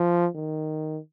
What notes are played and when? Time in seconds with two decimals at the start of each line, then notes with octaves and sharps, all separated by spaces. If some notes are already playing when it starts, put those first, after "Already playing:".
Already playing: F3
0.35 D#3